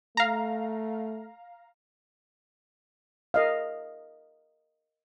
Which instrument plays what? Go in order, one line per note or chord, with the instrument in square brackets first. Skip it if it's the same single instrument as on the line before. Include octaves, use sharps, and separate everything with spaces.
[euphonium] A3 [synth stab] F5 A#5
[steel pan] A#4 D#5 F5